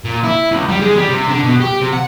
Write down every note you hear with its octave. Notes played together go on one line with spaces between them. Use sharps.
A#2
E4
C#2
G3
G#3
G3
C3
D3
B2
G4
C3
F#5